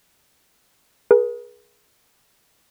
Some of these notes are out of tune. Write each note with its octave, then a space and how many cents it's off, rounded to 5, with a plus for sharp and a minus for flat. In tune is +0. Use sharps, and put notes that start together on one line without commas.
G#4 +5 B4 -45